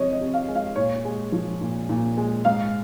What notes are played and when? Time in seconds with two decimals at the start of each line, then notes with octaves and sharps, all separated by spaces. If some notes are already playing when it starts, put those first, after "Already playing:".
Already playing: C3 F3 G#3 C#5 D#5
0.13 D#5
0.20 C3
0.34 F5
0.48 G#3
0.55 F5
0.76 A#2 C#5
1.05 G#3
1.32 F3
1.61 A#2
1.89 A#2
2.17 G#3
2.45 G#2 F5